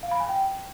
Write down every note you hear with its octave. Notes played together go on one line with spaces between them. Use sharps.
F5
B5
G#5
G5